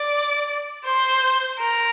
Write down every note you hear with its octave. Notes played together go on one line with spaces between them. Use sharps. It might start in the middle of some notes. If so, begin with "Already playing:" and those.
Already playing: D5
C5
A#4